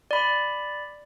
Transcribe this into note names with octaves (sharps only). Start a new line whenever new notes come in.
D5 B5